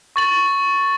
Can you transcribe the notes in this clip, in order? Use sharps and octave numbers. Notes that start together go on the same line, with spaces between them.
C#6 A6 F#7